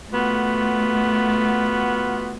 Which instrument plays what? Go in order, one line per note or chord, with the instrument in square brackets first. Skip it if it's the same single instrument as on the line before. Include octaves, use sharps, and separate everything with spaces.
[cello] A3 [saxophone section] B3 F4 F#4